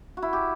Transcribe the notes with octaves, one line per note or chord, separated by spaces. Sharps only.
F#4
E4
G4